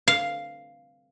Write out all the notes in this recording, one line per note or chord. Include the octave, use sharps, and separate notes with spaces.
F5